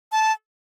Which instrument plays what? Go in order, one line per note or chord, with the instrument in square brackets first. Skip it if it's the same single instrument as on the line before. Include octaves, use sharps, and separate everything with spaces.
[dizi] A5